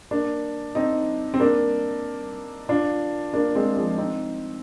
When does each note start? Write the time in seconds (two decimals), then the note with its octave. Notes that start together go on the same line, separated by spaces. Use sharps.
0.11 A#3 D4
0.75 C4 D#4
1.34 C4
1.40 A#3 D4
2.69 D4 F4
3.33 A#3 D4
3.55 G#3 C4
3.77 F3 G#3
3.98 C4 D#4